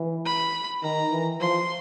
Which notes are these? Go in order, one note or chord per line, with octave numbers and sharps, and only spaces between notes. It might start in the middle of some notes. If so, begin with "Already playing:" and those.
Already playing: E3
B5
D#3 A#5
E3
F3 C6